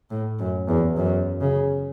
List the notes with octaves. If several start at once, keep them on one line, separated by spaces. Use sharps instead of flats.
A2
F#2
E2
F#2
C#3